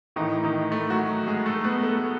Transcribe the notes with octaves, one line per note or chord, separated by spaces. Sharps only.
A2 D#3 E3 D#4
D#3 D#4
A3
F#3 F#4
G#3 G#4
A3 A4
B3 B4
A3 A4